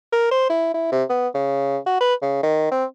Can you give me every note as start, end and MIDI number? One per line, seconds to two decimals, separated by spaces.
0.12 0.29 70
0.31 0.49 72
0.49 0.69 64
0.74 0.88 64
0.92 1.04 48
1.10 1.28 59
1.34 1.78 49
1.86 1.99 66
2.00 2.14 71
2.22 2.41 49
2.43 2.69 51
2.71 2.85 60